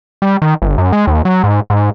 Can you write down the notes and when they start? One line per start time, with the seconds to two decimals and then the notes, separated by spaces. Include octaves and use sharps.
0.22 G3
0.42 D#3
0.62 G1
0.78 F#2
0.92 G#3
1.07 D#2
1.25 F#3
1.44 G#2
1.70 G#2